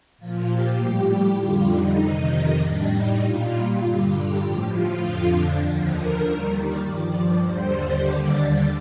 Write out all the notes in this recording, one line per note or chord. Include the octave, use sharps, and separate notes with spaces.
A#2 F3 F4
G4
A2 G3
G4
F2 D3 G3 F4
D#4
F2 C3 D#3
A2 G3 D4
D#4
A#2 G3 F4
G2 D3 G3
G4
A2 F3
F4
F2 D3 F3
D4
D#2 D3 F3
A#4
D#2 D#3 G3
D5
G2 F3 D5
D#2 D3 G3 C5
D#2 D3 G3 D5